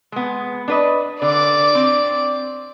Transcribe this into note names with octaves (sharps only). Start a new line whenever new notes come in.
G#3 B3
D4 B4 D#5
D3 D5 D6
C4